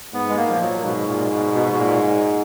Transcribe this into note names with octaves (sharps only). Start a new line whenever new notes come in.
G#2 B3
G#3
A#3
A#2 F3
F#3
G#2 B2
A#2
B2
B2
B2
A#2